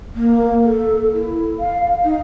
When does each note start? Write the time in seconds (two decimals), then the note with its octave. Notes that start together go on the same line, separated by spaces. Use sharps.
0.15 A#3
0.65 A4
1.13 E4
1.59 F5
2.04 D#4